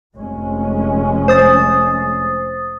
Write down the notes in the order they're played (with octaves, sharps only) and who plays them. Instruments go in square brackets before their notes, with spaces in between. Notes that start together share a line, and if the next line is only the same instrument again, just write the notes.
[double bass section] F1 G#3 C#4
[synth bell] C5 D#6 A6